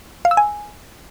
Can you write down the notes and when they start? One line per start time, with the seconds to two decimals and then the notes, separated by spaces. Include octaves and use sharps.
0.25 F5
0.31 E6
0.37 G#5